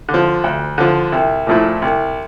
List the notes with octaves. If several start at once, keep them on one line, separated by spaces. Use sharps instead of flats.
D3
F3
D2
D3 F3
C2
A#2 F3 A3 E4
C2